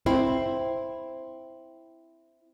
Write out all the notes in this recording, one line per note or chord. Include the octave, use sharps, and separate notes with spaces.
C4 E4